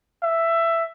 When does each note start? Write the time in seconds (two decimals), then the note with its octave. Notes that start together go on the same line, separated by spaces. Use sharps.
0.23 E5